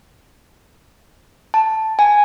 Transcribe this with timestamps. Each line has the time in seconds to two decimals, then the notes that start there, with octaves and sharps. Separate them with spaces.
1.54 A5
1.99 G#5